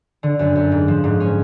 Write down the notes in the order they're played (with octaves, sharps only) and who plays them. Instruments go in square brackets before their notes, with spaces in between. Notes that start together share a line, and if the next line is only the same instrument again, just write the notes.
[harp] D3
F#2
F#2
G#2
F3
G#2
C#4